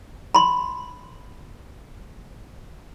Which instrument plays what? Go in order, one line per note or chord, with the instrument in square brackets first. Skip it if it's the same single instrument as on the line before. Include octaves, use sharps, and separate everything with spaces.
[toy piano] B5 C6